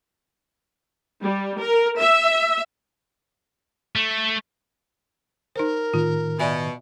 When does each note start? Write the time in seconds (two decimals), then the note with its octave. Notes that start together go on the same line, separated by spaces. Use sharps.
1.23 G3
1.61 A#4
1.99 E5
3.96 A3
5.56 D#4 A#4 C5
5.94 A2 D#3 F4
6.40 B2 D5 E5 G#5